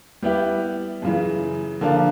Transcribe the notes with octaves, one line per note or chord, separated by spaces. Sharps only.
G3 B3 E4 G4
F#2 C#3 E3
D3 F3 A#3 D4 F4